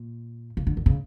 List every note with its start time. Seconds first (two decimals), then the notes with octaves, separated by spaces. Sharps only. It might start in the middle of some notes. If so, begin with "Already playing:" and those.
Already playing: A#2
0.57 C#3
0.67 D3
0.77 D3
0.86 C#3